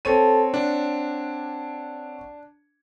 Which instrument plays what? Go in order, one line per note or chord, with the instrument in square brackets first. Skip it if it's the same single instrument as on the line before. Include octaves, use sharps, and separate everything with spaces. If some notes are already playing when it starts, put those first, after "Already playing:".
[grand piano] C4 C#5 D#7 [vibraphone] A4 A5
[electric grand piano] D4 [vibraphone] F#5